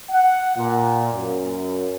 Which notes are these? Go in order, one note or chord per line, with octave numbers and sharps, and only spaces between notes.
F#5
A#2
F#2